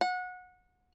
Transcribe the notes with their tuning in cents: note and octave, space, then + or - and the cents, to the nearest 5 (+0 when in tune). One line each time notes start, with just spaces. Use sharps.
F#5 -25